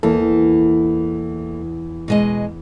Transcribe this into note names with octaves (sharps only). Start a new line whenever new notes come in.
E2 E3 A#3 A4
B2 G#3 D#5